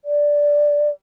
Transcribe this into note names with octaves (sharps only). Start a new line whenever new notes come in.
D5